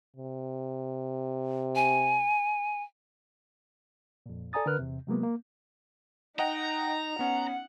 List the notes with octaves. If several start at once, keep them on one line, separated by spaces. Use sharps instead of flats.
C3
G#5
F2 A#2
A4 D5 G#5 A#5 D#6 A6
D3 A#4 B4 F6 F#6
E2 C3
C3 F#3 G#3 A#3 B3
A#3
D#4 D#5 F#5 G5 A#5
B3 C#4 F#5